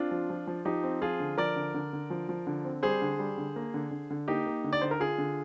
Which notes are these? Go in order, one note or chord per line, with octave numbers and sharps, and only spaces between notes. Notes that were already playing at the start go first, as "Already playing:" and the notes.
Already playing: C4 D4 F4
F3
F3
F3
F3 D#4 G4
C4
F3 F4 G#4
D3
F3 A#4 D5
D3
D3
D3
F3
F3
D3
C4
G3 G#4 C5
D3
G3
D3
A#3
D3
D3
D3
A#3 D#4 G4
A#3
D3
D5
D3 C5
A#4
D3 F4 G#4
D3